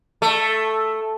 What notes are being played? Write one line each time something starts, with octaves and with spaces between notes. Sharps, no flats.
A3